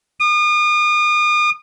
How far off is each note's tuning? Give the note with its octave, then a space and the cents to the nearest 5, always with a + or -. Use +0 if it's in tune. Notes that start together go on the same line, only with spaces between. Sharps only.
D#6 -40